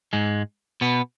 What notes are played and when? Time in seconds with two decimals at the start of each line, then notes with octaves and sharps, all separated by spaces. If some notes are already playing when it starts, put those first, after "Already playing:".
0.13 G#2 G#3
0.81 B2 B3